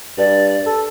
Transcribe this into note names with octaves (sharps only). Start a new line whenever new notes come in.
G2 D5
A4